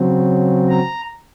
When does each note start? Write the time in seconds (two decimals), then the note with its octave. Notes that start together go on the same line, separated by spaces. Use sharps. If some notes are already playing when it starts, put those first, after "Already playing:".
Already playing: C#3 F#3 C4
0.69 A#5